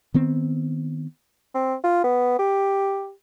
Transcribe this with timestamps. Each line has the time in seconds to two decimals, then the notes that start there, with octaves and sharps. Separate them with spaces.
0.14 D#3 B3 C4
1.54 C4
1.83 F4
2.04 B3
2.39 G4